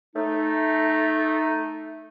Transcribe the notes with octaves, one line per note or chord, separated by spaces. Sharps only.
A3 D#4